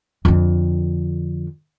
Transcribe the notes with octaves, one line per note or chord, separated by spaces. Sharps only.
F2 D3